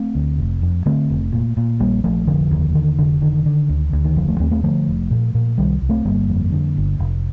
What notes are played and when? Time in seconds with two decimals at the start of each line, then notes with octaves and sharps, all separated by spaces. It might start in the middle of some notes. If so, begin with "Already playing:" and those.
Already playing: A3 C4
0.15 D2
0.38 F1
0.62 F2
0.86 D3 A3 C4
1.10 F1
1.32 A#2
1.57 A#2
1.80 A#1 G3 A#3
2.04 A#1 F3 A3
2.27 F1 D3 F3
2.51 D#2
2.75 D3 D#3
2.98 F1 D3
3.22 D3 D#3
3.46 D3
3.69 D2
3.93 D2
4.05 D#3
4.16 F1 D3 F3
4.28 F3 A3
4.40 D#2 A3 C4
4.51 A3 C4
4.64 D3 F3 A3
4.87 F1
5.11 A#2
5.35 A#2
5.58 C2 D#3 G3
5.82 C2
5.89 A3 C4
6.05 G1 G3 A#3
6.29 F2
6.52 D3
6.77 G1
6.99 F1